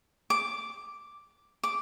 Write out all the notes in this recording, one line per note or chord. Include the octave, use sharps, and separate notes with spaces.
D6
D6